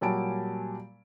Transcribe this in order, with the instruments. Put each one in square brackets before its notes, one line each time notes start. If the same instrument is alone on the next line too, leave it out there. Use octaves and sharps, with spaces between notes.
[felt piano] A#2 F#3 G3 G#5 A5 D7